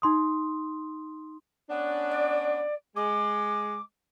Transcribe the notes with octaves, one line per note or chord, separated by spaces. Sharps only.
D#4 C6 D#6
B3 C#4 D4
D5
G#3 D6